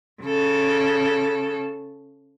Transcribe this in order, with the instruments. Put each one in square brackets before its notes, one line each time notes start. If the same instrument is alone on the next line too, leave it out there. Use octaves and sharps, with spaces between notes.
[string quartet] C#3 A4